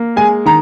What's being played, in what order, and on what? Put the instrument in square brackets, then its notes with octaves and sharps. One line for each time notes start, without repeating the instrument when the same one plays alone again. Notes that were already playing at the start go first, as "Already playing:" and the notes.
Already playing: [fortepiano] A#3
[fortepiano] G#3 [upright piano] G#5
[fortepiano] D#3 [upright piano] A#5